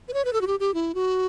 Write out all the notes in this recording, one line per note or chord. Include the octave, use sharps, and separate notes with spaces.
B4
C#5
B4
A4
F#4
G4
G4
E4
F#4